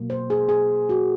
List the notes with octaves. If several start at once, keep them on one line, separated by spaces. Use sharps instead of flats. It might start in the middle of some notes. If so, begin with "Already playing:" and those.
Already playing: B2 F#3 A#3
C5
G#4
G#4
F#4